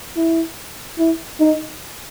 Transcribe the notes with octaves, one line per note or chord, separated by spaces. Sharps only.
E4
E4
D#4